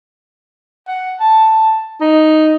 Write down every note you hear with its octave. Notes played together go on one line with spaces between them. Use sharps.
F#5
A5
D#4